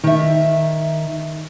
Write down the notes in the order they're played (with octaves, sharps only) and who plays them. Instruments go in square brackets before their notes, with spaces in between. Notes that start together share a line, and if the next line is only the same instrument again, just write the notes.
[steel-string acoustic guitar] D#3 E5